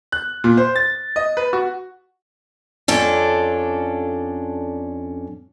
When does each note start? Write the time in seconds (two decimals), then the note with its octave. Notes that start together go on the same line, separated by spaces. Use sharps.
0.12 F#6
0.44 A#2
0.57 C5
0.76 A6
1.16 D#5
1.37 B4
1.53 F#4
2.88 F2 C#4 D4 A4